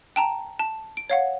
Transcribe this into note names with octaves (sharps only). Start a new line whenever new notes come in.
G5 A5 A#5
A5
D7
C#5 F5 F#5